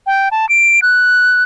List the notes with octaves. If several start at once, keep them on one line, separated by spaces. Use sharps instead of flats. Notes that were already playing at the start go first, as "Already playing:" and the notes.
G5
A5
D7
F#6